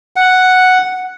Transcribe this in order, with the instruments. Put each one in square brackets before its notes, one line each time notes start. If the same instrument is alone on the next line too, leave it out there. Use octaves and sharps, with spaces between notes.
[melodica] F#5